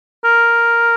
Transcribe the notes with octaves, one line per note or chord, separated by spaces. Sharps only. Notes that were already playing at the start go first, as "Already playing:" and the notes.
A#4